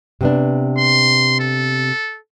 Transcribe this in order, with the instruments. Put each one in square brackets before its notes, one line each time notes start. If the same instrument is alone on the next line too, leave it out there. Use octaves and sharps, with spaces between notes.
[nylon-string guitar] C3 B3 D4
[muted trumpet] C6
A4